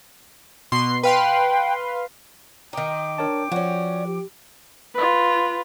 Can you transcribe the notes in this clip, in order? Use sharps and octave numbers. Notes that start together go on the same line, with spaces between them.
B2 C6 C7
B4 F5 G5 C6
D#3 D#4 G5 D6
D4 A#4 C#5 A5
F3 C#4 F#4 D5
G4
F4 B4